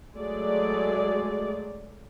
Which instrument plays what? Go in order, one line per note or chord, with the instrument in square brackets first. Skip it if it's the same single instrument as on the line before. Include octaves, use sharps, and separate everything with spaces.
[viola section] F#3 G#3 A3 G#4 D5